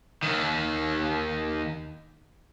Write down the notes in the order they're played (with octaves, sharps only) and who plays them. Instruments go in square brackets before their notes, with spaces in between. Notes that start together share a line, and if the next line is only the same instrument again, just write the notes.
[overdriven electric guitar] D#2 D#3